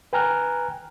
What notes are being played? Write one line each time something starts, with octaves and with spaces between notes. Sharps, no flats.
B4 G5 G#5 A#5 F6 F#6